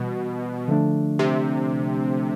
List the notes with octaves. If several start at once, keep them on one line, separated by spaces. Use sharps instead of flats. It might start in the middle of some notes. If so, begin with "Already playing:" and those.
Already playing: B2 E3 G3
D3 F3 A3 D4
C3